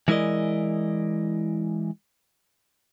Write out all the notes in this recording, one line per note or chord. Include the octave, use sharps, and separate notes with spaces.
E3 G#3 E4 A#4 D5 D#5